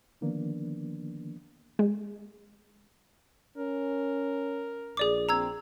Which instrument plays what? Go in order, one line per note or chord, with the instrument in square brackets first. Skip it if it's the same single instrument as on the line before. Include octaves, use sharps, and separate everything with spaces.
[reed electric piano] D3 D#3 F3 A#3 B3 D4
[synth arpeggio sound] G#3
[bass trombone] C#4 [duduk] A#4
[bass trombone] A#1 [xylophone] G#4 D5 D6
[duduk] C4 [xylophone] A#5 E6 G#6